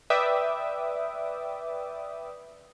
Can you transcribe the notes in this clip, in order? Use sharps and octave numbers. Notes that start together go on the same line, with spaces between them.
B4 D5 E5 G5 D6 D#6